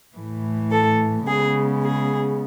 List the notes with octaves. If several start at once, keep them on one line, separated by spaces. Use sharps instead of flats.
A2 E3 A3
A4
C#3 G#3 B3 G#4
G#4